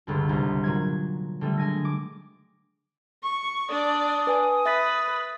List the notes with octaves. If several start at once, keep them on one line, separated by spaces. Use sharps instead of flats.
G1 C#2 D3
C2
A#2 F#3 G#6
D3 G3 A3
G#3 G#5 A#6
D6
C#6
D4 D5 D#6
B4 G#5
B4 E5 A6 B6